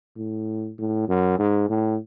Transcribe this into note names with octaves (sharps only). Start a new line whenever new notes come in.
A2
A2
F#2
G#2
A2